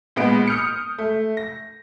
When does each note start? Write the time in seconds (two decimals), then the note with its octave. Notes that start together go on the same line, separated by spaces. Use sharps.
0.16 A#2 G#3 B3 D7
0.47 D#6 F6 G6 C#7
0.98 A3
1.37 A#6